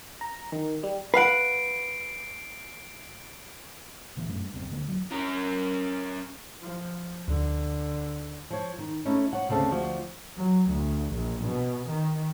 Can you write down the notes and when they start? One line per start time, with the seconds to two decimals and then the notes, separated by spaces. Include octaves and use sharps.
0.21 A#5
0.52 D#3
0.83 G3
1.14 B4 F5 F#5 C7 D7
4.16 G1 A#2 E3 A#3
4.28 F#2 A3 C4
4.40 G2
4.54 D1 B1 G2 C4
4.70 D2 D3 A#3
4.87 E1 F#3
5.12 C#4 A#4
6.62 F3
7.28 D2 D3
8.50 F3 C#5
8.78 D#3
9.05 A3 C#4 D#4 E4 A4
9.33 C#5 F#5
9.49 D2 C#3 C4 A4
9.71 D2 F3 F#4
10.37 F#3
10.71 D2
11.14 A#1
11.45 B2
11.90 D#3